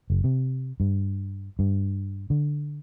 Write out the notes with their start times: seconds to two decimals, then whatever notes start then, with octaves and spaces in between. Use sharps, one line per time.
0.10 F#1
0.24 C3
0.80 G2
1.59 G2
2.30 D3